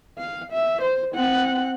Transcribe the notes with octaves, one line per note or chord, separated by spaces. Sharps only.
F5
E5
C5
C4 F#5